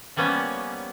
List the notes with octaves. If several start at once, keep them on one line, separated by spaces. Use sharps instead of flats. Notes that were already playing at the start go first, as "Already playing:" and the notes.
F3 G3 A#3 B3 C#4